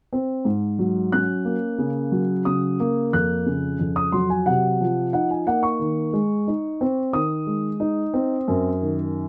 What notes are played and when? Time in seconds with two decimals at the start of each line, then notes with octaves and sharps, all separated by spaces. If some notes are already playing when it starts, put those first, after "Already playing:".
0.13 C4
0.45 G#2
0.79 F#3
1.12 C#4 F#6
1.45 A#3
1.79 C#3
2.12 F#3
2.45 C#3 D#6
2.80 A#3
3.13 F2 F#6
3.46 C#3
3.79 F2
3.96 D#6
4.12 F#3 C6
4.30 G#5
4.46 C3 F#5
4.80 F3
5.13 D#4 F#5
5.31 G#5
5.47 A#3 F#5
5.63 C#6
5.80 D#3
6.13 G#3
6.48 D#4
6.81 C4
7.13 D#3 D#6
7.47 G#3
7.80 D#4
8.14 C4
8.48 F#2
8.81 D#3